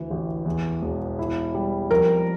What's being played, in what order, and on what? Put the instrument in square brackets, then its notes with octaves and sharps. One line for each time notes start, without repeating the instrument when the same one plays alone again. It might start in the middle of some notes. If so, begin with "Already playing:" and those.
Already playing: [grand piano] D2 E3
A1
E2
E1
E4
G3
[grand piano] F2 [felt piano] A#4